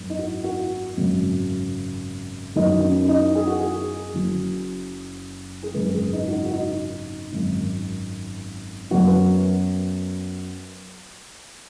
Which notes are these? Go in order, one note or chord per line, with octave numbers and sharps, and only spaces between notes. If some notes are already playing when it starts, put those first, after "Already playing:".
Already playing: G#1 F#2 D#3 B3
D#4
F#4
F#4
G#1 F#2 C#3 F#3
F#2 D#3 F#3 B3 D#4
C#4
D#4
G#4
F#4
G#4
F#1 F#2 F#3
G#4
G#1 F#2 C#3 G#3 B4
B4
G#4
D#4
F#4
D#4
F#4
D#4
G#1 F#2 D#3
F#2 F#3 B3 F#4
B4